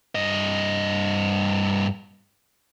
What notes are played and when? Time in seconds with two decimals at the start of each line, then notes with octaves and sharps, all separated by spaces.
0.15 G2 D#5